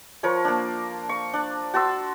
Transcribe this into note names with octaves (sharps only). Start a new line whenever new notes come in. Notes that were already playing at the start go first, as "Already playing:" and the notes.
F3 A#4 C#5 C#6
A#3 D4
C#6
D4
F#4 A5 C6 E6